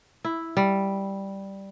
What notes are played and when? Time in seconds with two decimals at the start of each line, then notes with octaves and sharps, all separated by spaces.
0.25 E4
0.57 G3